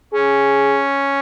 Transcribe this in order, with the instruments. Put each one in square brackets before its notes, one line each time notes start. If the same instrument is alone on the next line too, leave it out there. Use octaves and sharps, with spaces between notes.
[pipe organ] C#4 [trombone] G#4